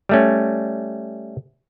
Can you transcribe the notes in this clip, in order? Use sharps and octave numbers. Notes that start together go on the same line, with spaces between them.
G3 A3 C#4